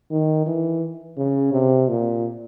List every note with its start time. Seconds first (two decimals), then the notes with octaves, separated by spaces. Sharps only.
0.11 D#3
0.46 E3
1.17 C#3
1.53 C3
1.89 A#2